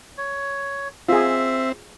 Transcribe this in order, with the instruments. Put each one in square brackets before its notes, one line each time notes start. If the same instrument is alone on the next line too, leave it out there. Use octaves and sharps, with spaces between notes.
[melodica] C#5
[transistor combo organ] C4 [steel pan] F4 G#4 [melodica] E5